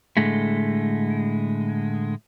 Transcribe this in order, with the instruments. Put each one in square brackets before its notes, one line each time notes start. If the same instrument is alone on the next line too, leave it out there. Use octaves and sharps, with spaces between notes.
[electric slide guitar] A2 D3 G#3 A3